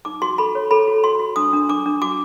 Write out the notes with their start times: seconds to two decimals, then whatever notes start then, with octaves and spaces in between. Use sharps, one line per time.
0.05 D#4 D6
0.22 F#4 C6
0.38 A4 B5
0.55 C#5
0.71 A4 B5
0.88 F#4
1.04 F#4 C6
1.20 F#4
1.36 D4 D#6
1.53 D4
1.69 D4 D6
1.86 D4
2.02 F#4 D6